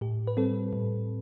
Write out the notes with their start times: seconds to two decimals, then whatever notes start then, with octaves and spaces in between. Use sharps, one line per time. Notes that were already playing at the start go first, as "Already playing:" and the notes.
0.01 A2 G4
0.27 B4
0.37 G3 C4 A4
0.73 A2